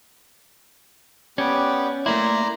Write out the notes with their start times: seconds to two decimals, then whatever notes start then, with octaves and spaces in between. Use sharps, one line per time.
1.38 B3 C#4 G4 D5
2.06 A3 A#3 E4 D5 A#5 C6